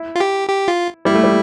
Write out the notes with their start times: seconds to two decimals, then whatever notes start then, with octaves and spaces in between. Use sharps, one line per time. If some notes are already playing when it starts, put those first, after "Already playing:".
Already playing: E4
0.16 F4
0.20 G4
0.49 G4
0.68 F4
1.05 G3 E4
1.15 A3
1.24 G3